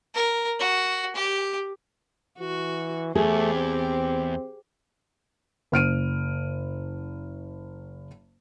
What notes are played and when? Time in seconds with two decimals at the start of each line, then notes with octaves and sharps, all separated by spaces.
0.15 A#4
0.60 F#4
1.16 G4
2.40 E3 F#4
3.15 E2 A3 G4 G#4 C5
3.54 C4
5.72 F#1 F6 D7 D#7